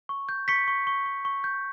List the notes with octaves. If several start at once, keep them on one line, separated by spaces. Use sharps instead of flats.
C#6
G6
C#6 B6 C#7
C#6
C#6
C#6
C#6
G6